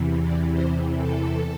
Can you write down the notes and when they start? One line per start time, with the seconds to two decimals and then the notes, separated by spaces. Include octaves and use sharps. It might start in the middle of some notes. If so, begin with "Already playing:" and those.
Already playing: E2 C3 E3
0.22 D5
0.51 C5
0.95 A4